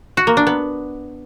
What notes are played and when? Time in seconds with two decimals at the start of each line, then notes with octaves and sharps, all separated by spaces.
0.17 F#4
0.27 A#3
0.37 D4
0.47 B3